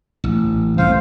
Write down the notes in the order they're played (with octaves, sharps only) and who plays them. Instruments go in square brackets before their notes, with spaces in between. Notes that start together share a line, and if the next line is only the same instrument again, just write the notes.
[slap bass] A1
[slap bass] C2 C#3 A3 [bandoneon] C5 F5